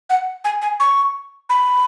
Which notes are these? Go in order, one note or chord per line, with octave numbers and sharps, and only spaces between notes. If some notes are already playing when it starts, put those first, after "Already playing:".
F#5
G#5
G#5
C#6
B5